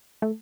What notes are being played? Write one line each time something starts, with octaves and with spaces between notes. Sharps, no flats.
A3